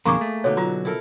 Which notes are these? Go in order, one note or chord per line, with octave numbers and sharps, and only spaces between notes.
F2 B2 D3 A#3 G#4 A#5 C#6 D6
A3
B2 D3 D#4 C#5
F#3 F4 A#5
E4 A4 A#4